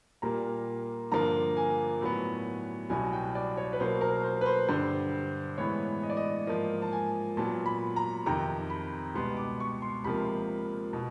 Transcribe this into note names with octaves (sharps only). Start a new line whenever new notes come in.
A#2 G3 A#3 A#5
G2 D3 F3 A#3 A#5
G#5
A2 F#3 B3
C2 B2 F#3 G#5
G5
D5
C#5
B4
B2 F#3 A#3 C5
A#4
C5
B4
C5
G2 D3 G3 C5
A2 E3 G#3 B3 C#5
D#5
D5
D#5
G#2 F3 A#3 D#5
A5
G#5
A#2 F#3 B3 A5
B5
A#5
F2 C3 D#3 A#5
B5
C#2 B2 G3 B3 C6
D6
C#6
C6
C#2 C3 F3 A#3 B5
B2